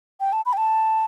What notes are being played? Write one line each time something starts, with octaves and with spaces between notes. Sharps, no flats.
G5
A5
B5
G5
A5